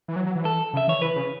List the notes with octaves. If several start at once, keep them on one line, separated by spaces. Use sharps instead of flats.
E3
F#3
F#3
E3
A4
C#3
E5
E3 C#5
E3 B4
C#3